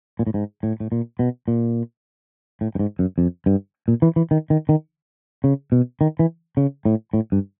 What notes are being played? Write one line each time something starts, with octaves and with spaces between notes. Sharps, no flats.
A#2
A2
G#2
A2
A2
A#2
B2
A#2
A2
G2
G#2
F#2
F2
G2
A#2
E3
E3
D#3
D#3
D#3
C#3
B2
D#3
E3
C#3
A2
A2
G2